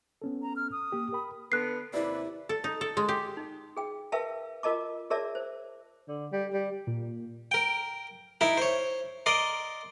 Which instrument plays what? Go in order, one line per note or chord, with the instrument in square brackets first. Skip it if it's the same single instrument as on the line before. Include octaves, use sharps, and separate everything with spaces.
[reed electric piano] B3 C#4 A4
[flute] A#5
F6
D#6
[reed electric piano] A#3 G4
A#4 G5 B5
[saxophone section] D3 B3 [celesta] F#6 C7
[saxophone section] D#2 C3 B4 [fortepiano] E4 [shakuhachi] D5
[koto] A4
D#4
A4
G#3
G4
[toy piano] D#4
G#4 G5
A#4 B4 E5 F5 G5 A5
F4 A#4 D#5 A5 D6
G#4 A#4 C#5 D5 E5 A5
C5
[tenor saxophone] D3
G3
G3
[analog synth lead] A#2
[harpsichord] A#4 G5
D#4 E4 A#4 E5
C5 C#5
A#4 D5 D#5 C6